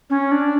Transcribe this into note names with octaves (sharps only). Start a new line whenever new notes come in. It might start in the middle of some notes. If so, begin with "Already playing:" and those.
C#4
D4